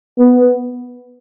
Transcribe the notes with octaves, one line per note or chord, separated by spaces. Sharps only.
B3